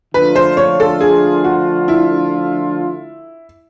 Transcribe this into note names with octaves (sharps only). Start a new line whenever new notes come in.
D3 F3 A3 D4 F4 B4
C5
C#5
A4
G#4
F#4
E4